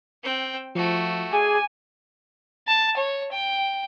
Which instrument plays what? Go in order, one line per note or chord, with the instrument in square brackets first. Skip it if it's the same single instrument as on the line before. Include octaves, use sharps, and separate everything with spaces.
[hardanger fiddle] C4 G5
[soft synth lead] F3 [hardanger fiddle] A3 F#4
[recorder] G#4 [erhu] G#5 [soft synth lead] D6
[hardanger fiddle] A5
C#5
G5